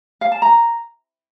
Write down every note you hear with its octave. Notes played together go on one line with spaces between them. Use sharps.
F5
A5
A#5